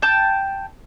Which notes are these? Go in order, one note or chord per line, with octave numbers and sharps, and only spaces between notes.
G5 A5 G6